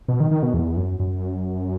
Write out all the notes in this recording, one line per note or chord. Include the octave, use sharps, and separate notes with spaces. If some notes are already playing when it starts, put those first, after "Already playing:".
B2
D#3
D#3
B2
E2
F#2
F#2